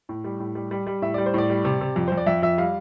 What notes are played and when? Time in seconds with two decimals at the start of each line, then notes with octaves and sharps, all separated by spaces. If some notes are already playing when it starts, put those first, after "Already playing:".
0.09 A2
0.24 G3
0.40 A2
0.55 G3
0.71 G3
0.87 G3
1.02 A2 E5
1.14 G3 D5
1.26 C5
1.34 A2 D5
1.50 G3
1.65 C3
1.81 C3
1.96 F2
2.08 F2 C5
2.17 D5
2.27 F2 E5
2.43 F2 E5
2.58 G3 F5